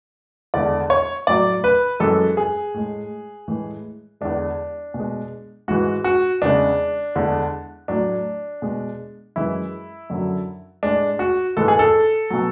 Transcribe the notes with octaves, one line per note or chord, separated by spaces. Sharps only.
E2 D3 G#3 D5
C#5
A2 F#3 D5
B4
F#2 E3 G#3 A4
G#4
A2 G#3
A2 E3 G#3
E2 D3 G#3 D4
B2
G#3
G#2 E3 G#3 F#4
F#4
E2 C#3 G#3 D4
E2 D3 G#3
A2 F#3 D4
B2 G#3
F#2 E3 G#3 E4
F#2 D3 F#3
A2 G#3 D4
F#4
G#2 E3 G#3 A4
G#4
A4
B2 F#3